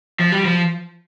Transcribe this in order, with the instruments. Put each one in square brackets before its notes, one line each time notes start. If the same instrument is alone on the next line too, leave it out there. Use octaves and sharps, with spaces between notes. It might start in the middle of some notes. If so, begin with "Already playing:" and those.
[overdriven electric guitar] F3
G3
F3